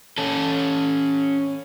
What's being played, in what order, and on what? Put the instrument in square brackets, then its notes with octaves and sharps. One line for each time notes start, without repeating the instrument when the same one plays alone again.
[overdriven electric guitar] C#4 A4